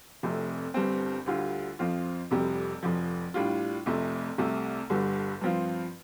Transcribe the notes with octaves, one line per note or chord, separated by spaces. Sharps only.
F1 F2 C3 A3
G1 G2 G3 C4
D2 D3 G3 F4
F2 F3 C4 F4
F1 F2 C3 G3
F1 F2 F3
A2 G3 D4 F4
F1 F2 C3 A3
C2 C3 A3
G1 G2 D3 G3
G2 F3 C4 F4